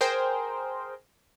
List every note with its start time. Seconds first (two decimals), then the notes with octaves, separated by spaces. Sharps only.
0.01 G#4 A#4 C5 G5